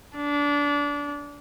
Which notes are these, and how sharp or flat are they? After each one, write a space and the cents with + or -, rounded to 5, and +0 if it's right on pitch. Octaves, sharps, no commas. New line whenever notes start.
D4 -25